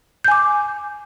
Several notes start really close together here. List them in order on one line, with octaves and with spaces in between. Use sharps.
G6 G#5 D6